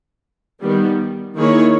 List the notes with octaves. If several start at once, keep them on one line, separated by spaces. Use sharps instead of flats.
D#3 G3 B3
D#3 A#3 E4 G#4 C#5